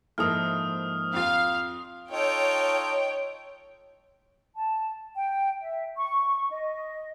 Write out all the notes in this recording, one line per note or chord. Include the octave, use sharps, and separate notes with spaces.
G#2 F3 A#3 E4 A4 A#4 D#6 F6
F2 F4 F5
D#4 F4 A4 C#5 G5
A5
G5
E5
C#6
D#5